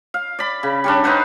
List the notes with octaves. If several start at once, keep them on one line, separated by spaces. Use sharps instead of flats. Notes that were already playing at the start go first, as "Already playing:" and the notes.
F5
D5 B5
C#3
G3 C#4 D4
D#4 B4 C5 F#5